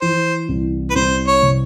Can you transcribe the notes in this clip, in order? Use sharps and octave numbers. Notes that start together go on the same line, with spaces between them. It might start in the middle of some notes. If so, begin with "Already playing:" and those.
E3 C5
C2
B4
C2 C5
C#5
C3